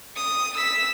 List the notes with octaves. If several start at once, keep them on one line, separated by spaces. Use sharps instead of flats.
D#6
E6 B6